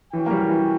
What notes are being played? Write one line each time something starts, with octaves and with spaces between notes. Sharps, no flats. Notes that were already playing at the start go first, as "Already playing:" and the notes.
E3 C#4 F#4 C#5 G5
A#3
G3
E3